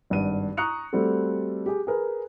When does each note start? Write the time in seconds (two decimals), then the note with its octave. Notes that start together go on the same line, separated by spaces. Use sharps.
0.10 G#1 G2 F#5 D#7
0.57 A#5 C#6 D#6 F#6 C#7 F7
0.93 G3 A3 C4 F#4 A4
1.66 G4 G#4
1.87 G#4 A#4 B4